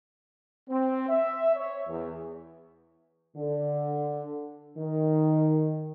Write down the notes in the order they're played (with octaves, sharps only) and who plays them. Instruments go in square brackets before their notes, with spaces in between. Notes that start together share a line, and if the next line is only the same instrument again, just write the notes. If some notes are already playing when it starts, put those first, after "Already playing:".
[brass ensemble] C4
E5
C#5
E2
[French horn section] D3
D#3